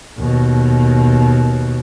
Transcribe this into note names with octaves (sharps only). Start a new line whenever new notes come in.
D#2 B2